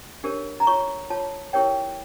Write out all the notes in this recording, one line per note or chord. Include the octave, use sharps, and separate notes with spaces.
D4 G4 A#4 C#5
A#5
F4 C#5 C#6
F4 C#5 A5
E4 G4 A#4 C#5 G5